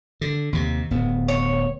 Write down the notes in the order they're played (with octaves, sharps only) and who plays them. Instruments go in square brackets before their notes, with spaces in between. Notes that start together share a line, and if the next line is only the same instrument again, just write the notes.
[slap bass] D3
D#2 C3
D1 B3
[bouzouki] C#5